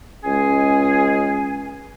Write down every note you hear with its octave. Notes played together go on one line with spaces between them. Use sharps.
C#2 G#3 C#4 G#4 G#5